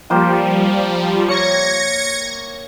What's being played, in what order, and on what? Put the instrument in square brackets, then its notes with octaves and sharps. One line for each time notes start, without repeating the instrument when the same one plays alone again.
[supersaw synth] F3 G3 [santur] A#3 C5 G5
[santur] C#5 [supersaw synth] G#6 A#6 C#7